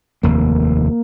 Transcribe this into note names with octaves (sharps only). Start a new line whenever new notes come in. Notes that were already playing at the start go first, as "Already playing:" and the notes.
F1 D#2 A#3